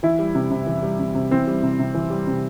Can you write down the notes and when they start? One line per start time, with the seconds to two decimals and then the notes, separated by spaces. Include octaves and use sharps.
0.03 E3 E4
0.19 G3
0.35 C3
0.51 C3
0.67 E3
0.82 G3
0.99 C3
1.15 C3
1.31 E3 C4
1.47 G3
1.63 C3
1.79 C3
1.95 E3
2.10 G3
2.27 C3